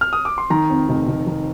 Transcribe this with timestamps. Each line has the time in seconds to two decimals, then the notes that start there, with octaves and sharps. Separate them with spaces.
0.01 F6
0.13 D#6
0.25 D6
0.38 C6
0.50 D#3 A#5
0.70 F2
0.89 F1
1.07 F1
1.27 D#3